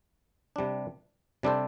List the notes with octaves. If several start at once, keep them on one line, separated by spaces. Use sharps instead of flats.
C3 G3 D4
C3 G3 D4 A4 C5